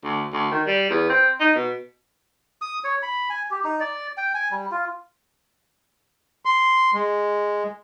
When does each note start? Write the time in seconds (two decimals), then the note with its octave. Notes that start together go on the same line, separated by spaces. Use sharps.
0.04 D2
0.33 D2
0.52 D#3
0.66 G3
0.90 E2
1.10 C4
1.40 D#4
1.55 B2
2.62 D#6
2.84 C#5
3.03 B5
3.30 G#5
3.51 G4
3.64 D#4
3.80 D5
4.18 G5
4.34 G#5
4.51 G3
4.71 F4
6.45 C6
6.94 G#3